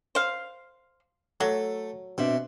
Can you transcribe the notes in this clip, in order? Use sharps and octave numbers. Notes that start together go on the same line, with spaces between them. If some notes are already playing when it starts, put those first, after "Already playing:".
C5 F5
F#3 A3
B2 C4 D4 E5